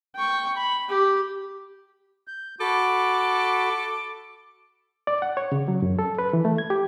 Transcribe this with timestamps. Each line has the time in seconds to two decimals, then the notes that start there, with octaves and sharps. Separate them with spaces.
0.16 G5 C#6
0.57 B5
0.89 G4
2.28 G6
2.61 F#4 A4 B5 D6
5.07 D5
5.22 F#5
5.37 C#5
5.52 C#3
5.68 F#3
5.82 F#2
5.99 A4
6.19 B4
6.33 E3
6.45 A3
6.58 G#6
6.70 G4